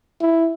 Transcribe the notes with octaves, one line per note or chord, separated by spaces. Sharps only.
E4